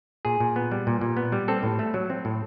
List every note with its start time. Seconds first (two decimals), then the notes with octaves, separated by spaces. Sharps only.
0.25 A#2 G#4
0.40 A#2
0.56 B3
0.72 G3
0.87 A#2
1.01 A#2
1.17 B3
1.32 G3
1.48 C4 A4
1.63 A2
1.79 A3
1.94 F#3
2.10 C4
2.25 A2